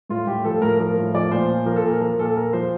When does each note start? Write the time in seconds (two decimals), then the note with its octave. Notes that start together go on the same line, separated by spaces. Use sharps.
0.09 A2 F4
0.27 A2 G4
0.45 F3 A4
0.62 A2 A#4
0.80 F3 A#4
0.98 A2
1.14 F3 D5
1.31 A#2 C5
1.49 A#2
1.66 F3 A#4
1.76 A4
1.83 A#2 A#4
2.01 F3 A#4
2.19 A#2 A4
2.36 A#2 A#4
2.53 F3 C5